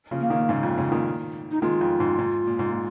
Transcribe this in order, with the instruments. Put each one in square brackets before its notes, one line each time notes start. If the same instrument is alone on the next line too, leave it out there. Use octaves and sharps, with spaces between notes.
[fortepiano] C#3 F3
[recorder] A#3
[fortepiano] A#2 D#3
G#2 C#3
F2 A#2
G#2 C#3
A#2 D#3
[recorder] D#4
[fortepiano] D#3 G#3 [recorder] F4
[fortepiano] F2
G#2
G#2
A#2
G#2
A#2